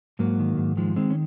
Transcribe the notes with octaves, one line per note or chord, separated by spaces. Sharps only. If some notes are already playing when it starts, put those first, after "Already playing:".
G#2 F#3 A#3
D#3
G#2
D#3 F3 G#3
D#3 G#3 C4
C#4